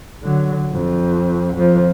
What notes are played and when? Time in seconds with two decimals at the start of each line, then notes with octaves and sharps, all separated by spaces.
0.23 D3 F#3
0.72 F2
1.55 F2 F3